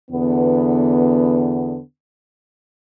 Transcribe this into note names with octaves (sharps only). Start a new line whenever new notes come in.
E2 D3 B3